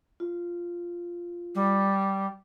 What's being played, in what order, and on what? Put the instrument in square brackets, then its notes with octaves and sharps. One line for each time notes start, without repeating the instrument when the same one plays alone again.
[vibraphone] F4
[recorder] G3